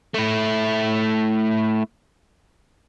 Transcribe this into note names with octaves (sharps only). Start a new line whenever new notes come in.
A3 E4